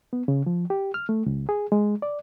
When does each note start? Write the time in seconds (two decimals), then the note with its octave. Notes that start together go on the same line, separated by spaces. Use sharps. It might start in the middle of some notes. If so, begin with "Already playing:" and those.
0.13 B3
0.28 C#3
0.46 F3
0.70 G4
0.94 F6
1.09 A3
1.26 C#2
1.49 G#4
1.72 G#3
2.02 D5